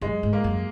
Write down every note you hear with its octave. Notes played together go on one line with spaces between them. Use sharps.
F#2 G#3
G#2
A#3
F#2